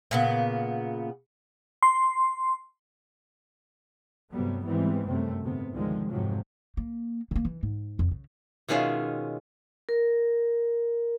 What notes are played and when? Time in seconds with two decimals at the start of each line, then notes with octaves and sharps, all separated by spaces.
0.11 A#2 C#3 B3
1.83 C6
4.31 G2 C3 F#3 G3 A3 B3
4.64 G#2 E3 G3 G#3 B3 C4
5.05 F#2 C3 A3 C4
5.41 D2 G#2 C3 B3
5.71 D2 D3 D#3 F3 G#3
6.08 F2 G#2 C3 F3 F#3
6.77 A#3
7.31 D3 A#3
7.45 E3
7.63 G#2
7.99 F2
8.11 C#3
8.69 B2 D#3 G#3 C#4 F4 E5
9.89 A#4